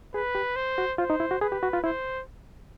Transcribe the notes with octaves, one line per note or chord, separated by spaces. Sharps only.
G#4 B4
G4
C5
F#4
F4 C5
D#4
E4
F#4
G#4 B4
G4
F#4
F4
E4 C5